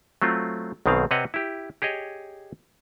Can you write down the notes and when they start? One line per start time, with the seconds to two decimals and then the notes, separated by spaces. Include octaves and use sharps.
0.22 F#3 A3 C4 F4
0.86 B1 B2 D#3 C4 G#4 F5
1.11 C3 C4 B4 C#5 D#5 F#5
1.34 E4 G4
1.82 G4 G#4 C#5 D#5